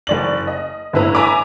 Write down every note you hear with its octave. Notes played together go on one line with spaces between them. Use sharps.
F#1 D5 F#7
D#5
G1 A2 E4 B4 A#5
E5 G#5 A#5 B5 D6